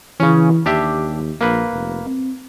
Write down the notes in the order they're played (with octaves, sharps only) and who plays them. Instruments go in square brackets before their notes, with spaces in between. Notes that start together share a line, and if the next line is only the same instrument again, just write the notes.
[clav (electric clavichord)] C#3 C#4 [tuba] E3
[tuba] D#2 [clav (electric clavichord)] D4 G4 E5
[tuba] A#1 [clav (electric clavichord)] A#3 B4
[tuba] F1
C4